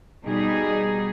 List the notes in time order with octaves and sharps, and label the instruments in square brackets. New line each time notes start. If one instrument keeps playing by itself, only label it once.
[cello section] B2 G3 D#4 G#4